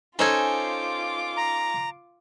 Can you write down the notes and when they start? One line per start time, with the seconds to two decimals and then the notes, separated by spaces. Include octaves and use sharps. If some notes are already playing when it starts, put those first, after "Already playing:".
0.19 C#4 D#4 F4 A4 C5 G#5 D6
1.37 A#5